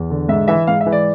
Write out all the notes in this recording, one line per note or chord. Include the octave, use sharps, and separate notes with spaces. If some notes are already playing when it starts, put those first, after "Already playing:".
Already playing: E2
D3
G#2 E5
E3 E5
G#2 F5
E5
E3
D5